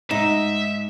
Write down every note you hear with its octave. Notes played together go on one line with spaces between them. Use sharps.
G#2 D#4 E5